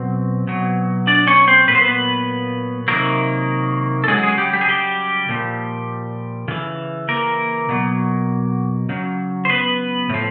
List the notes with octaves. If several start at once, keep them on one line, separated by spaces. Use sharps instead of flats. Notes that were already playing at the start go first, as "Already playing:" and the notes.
Already playing: B2 F#3 C4
B2 F#3
D4 D5
C#4 C#5
C4 C5
A#2 F#3 B4 C5
B3 B4
C3 D#3 F#3 A#3 A#4
A4
C#3 F#3 G#3 G#4
G#3 G#4
G3 G4
G3 G4
G#4
G3 G4
A#2 F3
C#3 E3
A#3 A#4
B2 F#3
C#3 F#3
C5
B3 B4
A2 F3